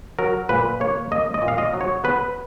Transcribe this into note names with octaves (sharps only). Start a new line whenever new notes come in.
F#3 A#4
A#2 B4
A#3 C#5
A#3 D#5
D#5
A#2
F5
D#5
F#3
C#5
B3 B4